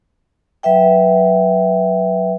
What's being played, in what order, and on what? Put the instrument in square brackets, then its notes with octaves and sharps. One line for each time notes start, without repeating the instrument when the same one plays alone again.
[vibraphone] F#3 B4 E5 G5